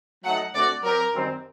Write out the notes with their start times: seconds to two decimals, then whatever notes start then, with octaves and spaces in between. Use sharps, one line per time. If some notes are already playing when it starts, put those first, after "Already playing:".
0.25 F#3 A3 D#4 F#5
0.54 D3 A3 C4 F#4 D5
0.84 F#3 C4 G4 A#4
1.14 F#2 D#3 G3 C4